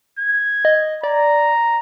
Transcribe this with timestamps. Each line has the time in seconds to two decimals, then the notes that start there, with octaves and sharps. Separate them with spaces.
0.19 G#6
0.65 D#5
1.03 D5 A#5